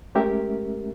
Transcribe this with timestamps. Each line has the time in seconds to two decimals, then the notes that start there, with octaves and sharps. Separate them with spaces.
0.15 G#3 A3 C#4 G4 A#4 E5